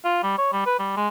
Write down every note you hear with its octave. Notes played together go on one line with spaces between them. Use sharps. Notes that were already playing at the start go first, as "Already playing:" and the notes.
F4
G3
C#5
G3
B4
G3
G#3